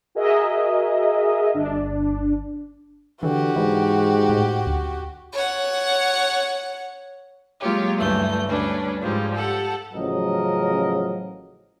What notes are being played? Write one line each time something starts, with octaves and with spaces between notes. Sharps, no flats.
F#4 G#4 A#4 D#5 E5
G1 D4
D3 E3 F#4 G4
G#2 E3
A2
D2
C#5 F#5
F#3 G#3 A#3 F4 G4 C#5
D2 G2 E3 A3 G6
D2 G3 C#4 D4 B4
G#2 F3 G3 G#3
G4 A4 F#5
A1 C#3 F3 F#3 A#4 D#5